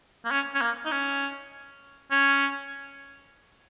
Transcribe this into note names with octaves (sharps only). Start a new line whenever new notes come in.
A#3
C#4
C#4
A#3
D#4
C#4
C#4